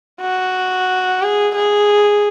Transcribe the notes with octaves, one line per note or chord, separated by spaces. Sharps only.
F#4
G#4
G#4